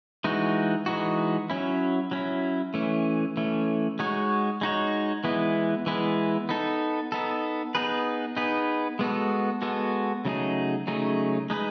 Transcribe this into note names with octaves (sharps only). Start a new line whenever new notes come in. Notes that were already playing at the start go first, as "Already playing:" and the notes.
E3 G#3 D#4 F#4
E3 G#3 D#4 F#4
F#3 C#4 E4
F#3 C#4 E4
E3 A3 C#4
E3 A3 C#4
G#3 D#4 F#4 C#5
G#3 D#4 F#4 C#5
E3 G#3 B3 E4
E3 G#3 B3 E4
B3 D#4 A4
B3 D#4 A4
B3 D#4 G#4 B4
B3 D#4 G#4 B4
G#3 B3 F#4 A4
G#3 B3 F#4 A4
C#3 F#3 A3 D#4 G#4
C#3 F#3 A3 D#4 G#4
G#3 D#4 G#4 B4